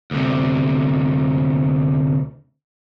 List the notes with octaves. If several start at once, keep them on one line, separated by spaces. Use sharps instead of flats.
D2 C3